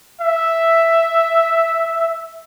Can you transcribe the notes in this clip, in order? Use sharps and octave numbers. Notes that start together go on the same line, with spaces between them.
E5